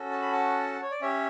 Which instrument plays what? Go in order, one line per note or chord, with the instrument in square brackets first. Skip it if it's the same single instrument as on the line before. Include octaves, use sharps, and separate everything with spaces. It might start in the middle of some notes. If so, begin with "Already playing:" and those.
Already playing: [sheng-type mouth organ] C#4 F#4 A4
A5
B5
F#5 A5
C#5
D5
C#4 G4 C#5 E5